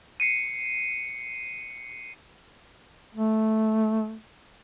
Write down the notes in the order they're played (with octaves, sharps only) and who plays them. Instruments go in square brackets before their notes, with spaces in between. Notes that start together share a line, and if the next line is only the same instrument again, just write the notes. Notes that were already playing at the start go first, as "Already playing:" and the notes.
[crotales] C7 C#7 D#7
[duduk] A3